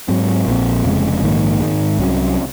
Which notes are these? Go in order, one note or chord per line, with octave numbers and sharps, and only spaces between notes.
G#2 F#3 C4
A#1 A#2 F3 C4
F1 F2 C#3 G#3
A#1 G#2 D#3 A#3
G#2 D#3 G#3
C2 C3 F#3 C#4